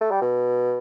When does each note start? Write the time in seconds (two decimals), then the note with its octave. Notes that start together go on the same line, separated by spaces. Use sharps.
0.01 A3
0.11 G3
0.22 B2